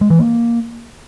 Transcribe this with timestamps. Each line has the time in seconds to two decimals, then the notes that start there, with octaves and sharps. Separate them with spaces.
0.01 G#3
0.10 E3
0.19 A#3